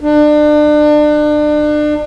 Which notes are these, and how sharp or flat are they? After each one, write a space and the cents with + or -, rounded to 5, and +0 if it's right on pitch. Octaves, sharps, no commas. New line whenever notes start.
D4 +35